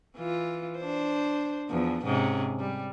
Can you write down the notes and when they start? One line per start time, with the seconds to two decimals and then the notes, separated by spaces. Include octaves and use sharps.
0.16 E3 F4
0.79 D4 C5
1.69 E2 F3
2.05 G#2 C3 C#4
2.59 G3